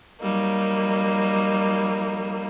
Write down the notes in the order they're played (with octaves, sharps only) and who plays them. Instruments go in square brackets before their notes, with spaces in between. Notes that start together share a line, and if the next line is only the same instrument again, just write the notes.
[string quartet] F#3 G3 A#3 D#4